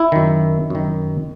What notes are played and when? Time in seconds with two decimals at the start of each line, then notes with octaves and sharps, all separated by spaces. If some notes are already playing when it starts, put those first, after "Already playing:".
Already playing: E4
0.12 F#2 D#3
0.70 F#2 D#3